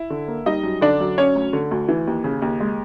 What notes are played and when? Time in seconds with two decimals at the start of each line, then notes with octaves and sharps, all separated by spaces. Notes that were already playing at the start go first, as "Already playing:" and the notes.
Already playing: E4
0.10 D3
0.28 A#3
0.46 G3 D#4 D#5
0.64 F#2
0.81 D3 D4 D5
1.00 F#2
1.18 F#3 C#4 C#5
1.36 D2
1.53 D3
1.71 D2
1.88 E3
2.07 D#2
2.24 C#3
2.42 D#2
2.60 G#3